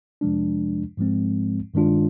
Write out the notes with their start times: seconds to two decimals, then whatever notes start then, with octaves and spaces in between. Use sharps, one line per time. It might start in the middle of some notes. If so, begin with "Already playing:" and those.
0.21 F2 C3 F3 G#3 D4
0.97 G#2 F3 G#3 C4
1.74 G2 D#3 G#3 D4 F4